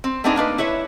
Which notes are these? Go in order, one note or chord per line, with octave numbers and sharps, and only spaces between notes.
C4
A3 B3 C4 D4 D#4 G#4
A#3 D4 D#4 B4
E4 B4 C#5 E5